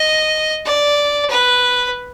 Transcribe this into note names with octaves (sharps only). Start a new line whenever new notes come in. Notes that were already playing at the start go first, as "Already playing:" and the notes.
Already playing: D#5
D5
B4